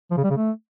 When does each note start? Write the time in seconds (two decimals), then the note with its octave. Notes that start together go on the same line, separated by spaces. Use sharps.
0.11 F3
0.17 C#3
0.24 G3
0.30 C#3
0.37 A3